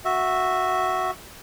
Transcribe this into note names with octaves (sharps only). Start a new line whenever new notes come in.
F#4 E5